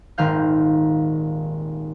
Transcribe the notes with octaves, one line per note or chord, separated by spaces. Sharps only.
D#1 G#1 D#3 F5 G6